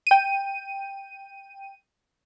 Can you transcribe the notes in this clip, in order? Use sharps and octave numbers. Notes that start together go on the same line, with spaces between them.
G5 D#7